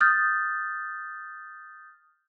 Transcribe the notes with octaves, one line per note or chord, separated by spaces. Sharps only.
D#6 F6 G6 A6